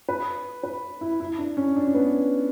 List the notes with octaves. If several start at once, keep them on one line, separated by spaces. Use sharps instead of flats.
B4
B4
E4
E4
D4
C#4
D4
C#4
B3